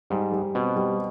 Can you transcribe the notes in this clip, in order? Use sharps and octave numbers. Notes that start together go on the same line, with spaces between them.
G#2 G3
G3
B2 C4
G3